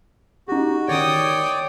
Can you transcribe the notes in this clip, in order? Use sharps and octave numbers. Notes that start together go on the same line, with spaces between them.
D#4 F#4 G4
D#3 C#5 D5 G5 D#6